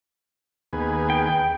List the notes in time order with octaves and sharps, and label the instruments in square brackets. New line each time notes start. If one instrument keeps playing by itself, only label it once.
[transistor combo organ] D#2 B3 G#4
[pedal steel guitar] G5